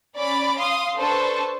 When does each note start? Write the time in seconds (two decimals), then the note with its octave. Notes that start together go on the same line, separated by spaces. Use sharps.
0.17 C#4 D5 B5 D6
0.57 F5 C6 D#6
0.96 D4 A4 B4 C5 A5 C#6